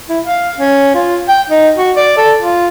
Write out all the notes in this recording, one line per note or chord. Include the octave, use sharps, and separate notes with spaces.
E4
F5
C#4
F4
G5
D#4
F#4
D5
A4
F4